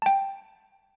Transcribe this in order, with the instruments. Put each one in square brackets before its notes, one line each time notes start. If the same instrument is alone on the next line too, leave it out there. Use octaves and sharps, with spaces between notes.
[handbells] G5 A5